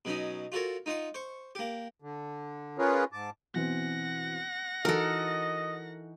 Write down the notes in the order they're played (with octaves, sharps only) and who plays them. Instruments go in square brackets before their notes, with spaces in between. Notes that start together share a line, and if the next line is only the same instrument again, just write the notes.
[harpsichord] B2 F#3 C#4 D#4
F4 F#4 A4 A#4 C#5
D#4 F4 F#5 C6
C5 C#6
A#3 G4
[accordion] D3
C#4 F4 G#4 A#4 B4 C#5
G#2 A5 D6
[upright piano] B2 E3 C4 [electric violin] F#5 A#6
[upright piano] E3 D#4 F#4 [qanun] A4 A#4 [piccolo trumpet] D#5